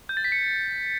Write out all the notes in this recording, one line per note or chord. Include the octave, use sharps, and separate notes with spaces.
G6
A6
B6
C#7